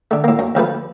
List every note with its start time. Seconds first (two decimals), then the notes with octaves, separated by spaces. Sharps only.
0.11 D3 A3
0.24 A2 A#3
0.39 F#2
0.55 D2 F3 A3 B4